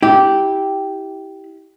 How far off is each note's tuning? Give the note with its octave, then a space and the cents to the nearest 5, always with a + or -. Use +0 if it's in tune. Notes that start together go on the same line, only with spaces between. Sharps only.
E4 -25 G4 -10